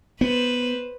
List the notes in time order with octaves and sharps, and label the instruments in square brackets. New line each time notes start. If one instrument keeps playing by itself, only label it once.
[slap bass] B3 [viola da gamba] B4 C5